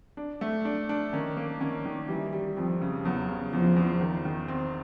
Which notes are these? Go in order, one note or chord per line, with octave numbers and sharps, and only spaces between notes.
D4
A3
D4
D4
D#3 C#4
A#3
D#3 C#4
D#3
E3 G3
G3
F2 F3
C#3
E2 F#3
C#3
E2 F3
E2
D#3
D#3
C4